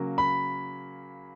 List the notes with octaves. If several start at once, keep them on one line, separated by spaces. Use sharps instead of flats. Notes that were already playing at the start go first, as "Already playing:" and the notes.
Already playing: C#3 F#3 A#3
B5